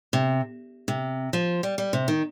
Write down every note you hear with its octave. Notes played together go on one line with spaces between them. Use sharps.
C3
C3
F3
G3
G3
C3
D#3